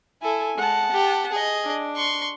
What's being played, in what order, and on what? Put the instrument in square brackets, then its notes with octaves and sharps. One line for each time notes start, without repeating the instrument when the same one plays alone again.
[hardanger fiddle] E4 [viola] A4 G#5
[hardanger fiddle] G#3 [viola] F#5 A5
[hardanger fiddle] G4
G#4 D#5
[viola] D4
[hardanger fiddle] C6 C#6